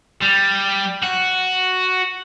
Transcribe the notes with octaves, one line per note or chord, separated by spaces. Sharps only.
G3
F#4